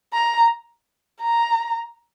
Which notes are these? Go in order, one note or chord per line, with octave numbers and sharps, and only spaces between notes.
A#5
A#5